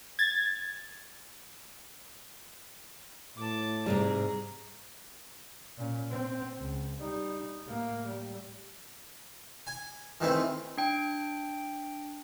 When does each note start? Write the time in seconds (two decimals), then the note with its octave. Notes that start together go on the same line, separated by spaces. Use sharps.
0.19 G#6 A6
3.38 A2 A5 D6
3.86 G#2 C3 G3 G#4 A#5
5.78 A#2 C#4
6.10 C4
6.58 C#2
7.00 G3 D#4
7.65 A2 A#3
8.06 G3
9.67 G#5
10.21 D#3 E3 A3 C4
10.78 D4 G5 D7